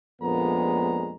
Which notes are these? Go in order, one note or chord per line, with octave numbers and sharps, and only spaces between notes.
A#1 F2 A#2 G#3 B3 A#5